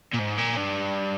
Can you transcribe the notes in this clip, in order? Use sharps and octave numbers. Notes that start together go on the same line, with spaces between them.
A#2
G#2
A#2
G2